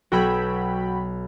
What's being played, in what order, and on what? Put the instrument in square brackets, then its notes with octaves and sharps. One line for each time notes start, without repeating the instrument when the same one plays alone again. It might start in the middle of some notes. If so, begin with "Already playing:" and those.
[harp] B1 E6 G#6 [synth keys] F#4 G5 B5